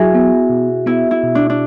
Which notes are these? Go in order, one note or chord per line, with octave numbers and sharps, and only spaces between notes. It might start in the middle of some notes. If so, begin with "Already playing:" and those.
Already playing: F#3 E4 F#4 G#4
B3
B2
B3 E4
E4
B2
D4
D4